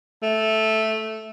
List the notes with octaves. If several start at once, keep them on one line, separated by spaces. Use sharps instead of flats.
A3